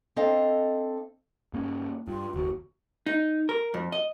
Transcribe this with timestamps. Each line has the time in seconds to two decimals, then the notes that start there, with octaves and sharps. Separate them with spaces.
0.16 C4 D4 A4 D#5 F5
1.53 G2 A#3 C#4
2.08 G2 F4
2.34 F#1 D#2 F#4
3.06 D#4
3.49 A#4
3.74 F2
3.92 D#5